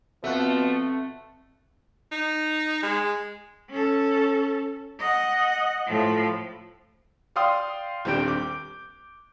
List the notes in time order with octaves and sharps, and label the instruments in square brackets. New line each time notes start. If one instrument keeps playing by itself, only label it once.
[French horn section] B2 F3 [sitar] A3 [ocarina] C4 [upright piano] E5 F#5 F#6
[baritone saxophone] D#4
G#3
[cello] C#4 A4
D#5 F#5
A2 F3
[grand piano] D5 F5 G5 C6 D#6
D#1 G3 C4 D4 G6 D7
D6